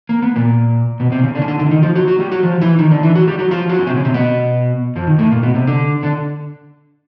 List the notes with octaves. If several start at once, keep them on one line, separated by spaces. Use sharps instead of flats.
A#3
B3
A#2 A#3
B2 B3
C3 C4
C#3 C#4
D3 D4
C#4
D3 D4
D3 D4
E4
D#3 D#4
F3 F4
F#3 F#4
F#3 F#4
G3 G4
F#3 F#4
F3 F4
E3 E4
D#3 D#4
D3 D4
E3 E4
F#3 F#4
G3 G4
F#3 F#4
F3 F4
F#3 F#4
C#4
C3 C4
C#3 C#4
C3 C4
B2 B3
F2 F3
D#3
A2 A3
A#2 A#3
B2 B3
C3 C4
D3 D4
D3 D4